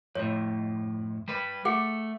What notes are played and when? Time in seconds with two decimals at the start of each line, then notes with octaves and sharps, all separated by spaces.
0.15 F2 A2 C#5
1.28 G3 B4
1.65 A3 G#4 F#5